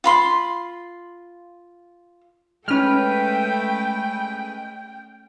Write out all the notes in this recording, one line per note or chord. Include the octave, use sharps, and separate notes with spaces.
F4 B5 C6
G#3 A3 C#4 B4 G5 F6